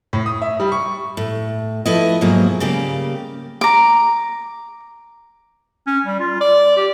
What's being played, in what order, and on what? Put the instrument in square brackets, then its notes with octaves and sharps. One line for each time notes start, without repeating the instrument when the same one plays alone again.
[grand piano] A2
D#6
E5
G3
C#6
[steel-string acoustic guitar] A2
F3 A3 E4 B4 D#5
G#2 B2 F3 F#3 A#3 G#4
C#3 G3 A#3 G4
[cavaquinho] A#5 D6
[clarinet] C#4
G3
F4
D5
G4